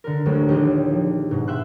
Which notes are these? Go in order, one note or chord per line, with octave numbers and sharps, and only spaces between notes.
D3 A#4
A1 D2 A2 F#3 G#3
A#1 D#2 D4 G4 D#5
F3
G#2 B2
E5 G5 C6 F#6